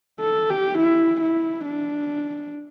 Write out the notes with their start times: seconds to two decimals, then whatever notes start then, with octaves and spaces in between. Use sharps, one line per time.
0.20 A4
0.50 G4
0.79 E4
1.21 E4
1.65 D4